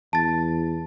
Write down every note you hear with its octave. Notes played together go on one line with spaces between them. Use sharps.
E2 A5 A6